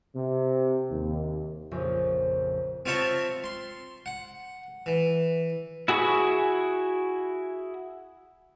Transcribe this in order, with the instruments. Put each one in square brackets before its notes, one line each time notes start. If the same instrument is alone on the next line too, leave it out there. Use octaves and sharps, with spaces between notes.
[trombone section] C3
D#2
[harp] A#1 F2 C#3
[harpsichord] C4 F4 C#5 E5 A5
C6
F#5
E3
[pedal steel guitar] E4 F#4 G#4 B5 C#6